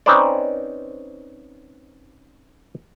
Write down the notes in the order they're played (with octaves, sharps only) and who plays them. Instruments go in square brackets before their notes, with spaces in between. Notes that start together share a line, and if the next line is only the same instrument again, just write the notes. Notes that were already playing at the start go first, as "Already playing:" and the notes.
[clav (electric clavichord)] C4 C#4 D#4 B4 C5 D5